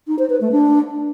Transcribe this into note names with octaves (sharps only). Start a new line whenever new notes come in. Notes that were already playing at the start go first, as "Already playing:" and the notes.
D#4
C5
B4
A3
D4